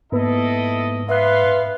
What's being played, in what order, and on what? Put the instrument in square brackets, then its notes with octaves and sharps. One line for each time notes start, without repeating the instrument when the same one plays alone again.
[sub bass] G#2 [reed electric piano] A#3 B3 B4 [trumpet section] E4 A4 D#5
[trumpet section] B3 F5 C6 [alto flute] B4 [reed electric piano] E5 F#6